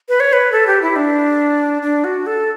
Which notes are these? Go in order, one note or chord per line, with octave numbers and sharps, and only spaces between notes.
B4
C#5
B4
A4
G4
E4
D4
D4
F#4
A4